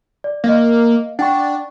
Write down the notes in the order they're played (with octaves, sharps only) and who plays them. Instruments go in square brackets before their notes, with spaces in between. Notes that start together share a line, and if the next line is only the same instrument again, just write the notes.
[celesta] D5
[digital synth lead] A#3 [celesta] D#5 F5
[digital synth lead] D4 [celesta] F#5 G5 C#6